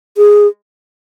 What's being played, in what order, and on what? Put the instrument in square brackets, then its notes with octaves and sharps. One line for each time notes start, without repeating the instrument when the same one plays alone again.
[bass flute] G#4